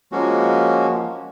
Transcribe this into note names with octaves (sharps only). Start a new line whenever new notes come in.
F3 G#3 A#3 C#4 F#4